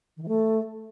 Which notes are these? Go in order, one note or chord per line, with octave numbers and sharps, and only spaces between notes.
D#3
E3
A3